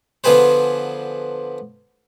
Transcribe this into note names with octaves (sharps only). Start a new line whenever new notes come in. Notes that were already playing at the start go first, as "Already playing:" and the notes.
D3 F3 B3 G#4 B4 C5